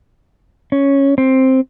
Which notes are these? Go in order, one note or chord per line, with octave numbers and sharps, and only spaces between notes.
C#4
C4